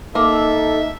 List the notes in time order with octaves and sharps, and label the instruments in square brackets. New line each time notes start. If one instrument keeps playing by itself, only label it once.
[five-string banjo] A#3 [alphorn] D#4 [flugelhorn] A4 [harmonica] E5